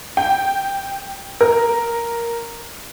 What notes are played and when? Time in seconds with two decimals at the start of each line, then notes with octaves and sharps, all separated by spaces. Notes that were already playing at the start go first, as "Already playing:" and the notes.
0.17 G5
1.41 A#4